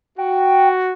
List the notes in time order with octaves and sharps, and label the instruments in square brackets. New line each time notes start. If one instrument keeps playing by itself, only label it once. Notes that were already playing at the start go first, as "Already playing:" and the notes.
[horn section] F#4 [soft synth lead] G5